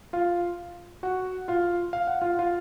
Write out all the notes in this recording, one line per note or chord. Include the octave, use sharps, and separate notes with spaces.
F4 F5
F#4 F#5
F4 F5
F5
F#5
F4 F5
F4 F5